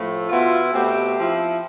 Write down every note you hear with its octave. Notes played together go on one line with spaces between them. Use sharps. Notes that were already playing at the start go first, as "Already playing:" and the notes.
Already playing: A2 F3 A3
B2 B3 E4 F4
B2 A3 C4 G4
F3 C4 E4